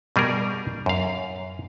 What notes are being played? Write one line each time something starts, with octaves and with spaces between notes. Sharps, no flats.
B2 G3 G#4 A#4
F#2 F5